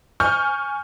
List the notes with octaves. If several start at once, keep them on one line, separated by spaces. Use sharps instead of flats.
G#5 C#6 F6 G6